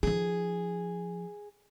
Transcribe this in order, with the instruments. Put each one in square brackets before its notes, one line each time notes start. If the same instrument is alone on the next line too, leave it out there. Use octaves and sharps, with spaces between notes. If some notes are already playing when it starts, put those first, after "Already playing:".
[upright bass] F3 D#4 [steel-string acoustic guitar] G#4